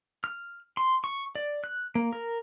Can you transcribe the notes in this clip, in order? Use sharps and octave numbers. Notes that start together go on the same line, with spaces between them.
F6
C6
C#6
D5
F#6
A#3
A#4